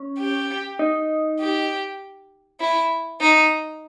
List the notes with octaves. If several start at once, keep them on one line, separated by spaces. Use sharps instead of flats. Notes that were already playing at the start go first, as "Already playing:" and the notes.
Already playing: C#4
G4
D#4
G4
E4
D#4